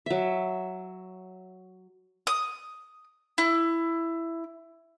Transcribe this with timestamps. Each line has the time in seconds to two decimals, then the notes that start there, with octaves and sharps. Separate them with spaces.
0.06 F#3 E5
2.27 D#6
3.38 E4